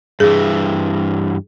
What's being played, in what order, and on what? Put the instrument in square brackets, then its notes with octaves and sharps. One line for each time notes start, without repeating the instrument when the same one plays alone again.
[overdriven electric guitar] G2 E3 [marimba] G#4